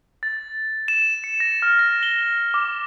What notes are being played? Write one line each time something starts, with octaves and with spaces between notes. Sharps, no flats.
A6
E7
C#7
A#6
F6
A#6
G7
D6